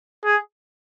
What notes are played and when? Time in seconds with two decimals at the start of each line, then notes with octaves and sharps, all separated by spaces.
0.25 G#4